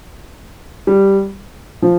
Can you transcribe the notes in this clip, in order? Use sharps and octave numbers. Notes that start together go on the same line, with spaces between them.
G3
F3